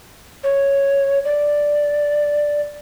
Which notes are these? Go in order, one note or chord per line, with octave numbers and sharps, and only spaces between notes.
C#5
D5